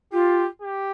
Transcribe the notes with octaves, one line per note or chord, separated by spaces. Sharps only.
F4 G4
G4